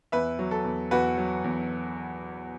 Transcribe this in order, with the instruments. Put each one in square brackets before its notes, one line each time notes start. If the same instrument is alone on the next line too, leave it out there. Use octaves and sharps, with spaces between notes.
[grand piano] E2 B4 E5
F#3
A4
E2
E2 F#4 B4
F#3
E2